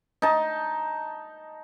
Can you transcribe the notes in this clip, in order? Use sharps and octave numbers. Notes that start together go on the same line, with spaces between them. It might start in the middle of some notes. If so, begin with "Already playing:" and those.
D#4 A5